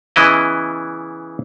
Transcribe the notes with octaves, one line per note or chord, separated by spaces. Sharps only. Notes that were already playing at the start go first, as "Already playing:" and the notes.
C#3 E3 B3 E4 D#5